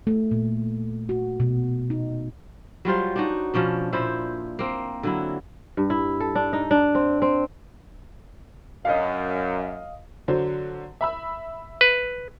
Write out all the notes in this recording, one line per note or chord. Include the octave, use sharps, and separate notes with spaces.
A3
A#2
F#4
B2
D#4
F#3 G3 F4 C5
D4 D#4 F#4
B2 F3 C#4 D4
A#2 F3 E4 C5
A#3 C4
D3 F#3 E4
G2
E4
A4
D4
D#4
D4
C4
C4
F#2 D#5 F5
D3 F#3 C5
E5 B5 E6
B4